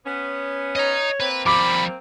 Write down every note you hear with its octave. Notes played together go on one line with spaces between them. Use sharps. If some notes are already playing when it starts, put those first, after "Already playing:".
B3 C#4
C#5 D#5 A#5
A#3 C4 B4
F3 G3 B5 D6